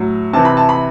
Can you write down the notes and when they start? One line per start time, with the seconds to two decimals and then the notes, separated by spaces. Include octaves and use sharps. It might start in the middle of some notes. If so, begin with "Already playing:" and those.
Already playing: A2 F#3
0.33 C3 E3 A5
0.45 B5
0.57 A5
0.69 B5